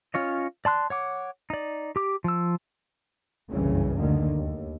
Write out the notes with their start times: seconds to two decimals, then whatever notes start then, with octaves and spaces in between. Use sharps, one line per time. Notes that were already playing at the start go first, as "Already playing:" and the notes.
0.14 C#4 F4 C#5 D#5
0.65 D5 A5 C6 F#6
0.90 C#5 F#5 D6
1.50 D#4 D5
1.96 G4 D6
2.24 F3 E6
3.53 F#1 C2 G2 C#3 E3 C#4
3.98 D2 D3 D#3 A#3
4.37 D#2